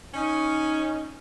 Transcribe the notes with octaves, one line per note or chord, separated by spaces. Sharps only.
C#4 D#4